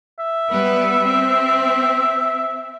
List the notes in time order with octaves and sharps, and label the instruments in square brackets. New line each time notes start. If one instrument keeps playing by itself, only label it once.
[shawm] E5
[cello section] G3 B3 B4
C4